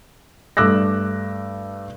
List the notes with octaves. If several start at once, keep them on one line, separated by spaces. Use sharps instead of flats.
G2 A3 D6 E6 F#6 A#6